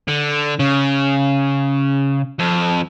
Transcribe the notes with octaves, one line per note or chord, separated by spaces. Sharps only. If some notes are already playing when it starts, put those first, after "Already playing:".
D3
C#3
F2